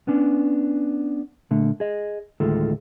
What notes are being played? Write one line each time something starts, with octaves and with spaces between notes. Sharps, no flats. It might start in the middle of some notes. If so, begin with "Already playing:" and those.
B3 C#4 D4
A#2 D3 A3
G#4 D#5
D2 A2 D#3 G#3 F4 A4